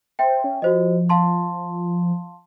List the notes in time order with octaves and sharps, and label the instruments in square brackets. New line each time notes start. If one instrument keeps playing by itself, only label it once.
[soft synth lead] C5 [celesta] E5 G5
[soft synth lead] C#4
[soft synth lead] F3 [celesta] F#4 C5 D#5
[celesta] F5 A5 C6